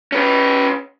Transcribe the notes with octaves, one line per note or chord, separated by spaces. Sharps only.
C#4 B4